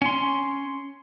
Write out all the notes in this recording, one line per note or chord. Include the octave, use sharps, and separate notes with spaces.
C#4 C6